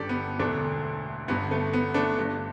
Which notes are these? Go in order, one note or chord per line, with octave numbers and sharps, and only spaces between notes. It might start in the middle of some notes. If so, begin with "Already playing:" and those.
Already playing: G1 G2 D3 G4 A4 D5
B3
E1 D2 D3 A3 D4
G1 G2 D3 B3
A3
B3
A3 D4
G1 G2 D3